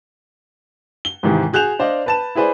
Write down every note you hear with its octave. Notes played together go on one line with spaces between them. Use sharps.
G7
G#2 C3 D#3 E3
F#4 G#4 F#6 G6 E7 F7
D4 C5 D5 D#5 F5
B4 A5 E7
E4 G#4 B4 C5 D5